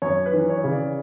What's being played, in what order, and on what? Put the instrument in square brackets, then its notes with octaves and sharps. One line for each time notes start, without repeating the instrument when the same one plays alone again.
[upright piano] F#2 C#5
B4
E3
C#5
C#3
D5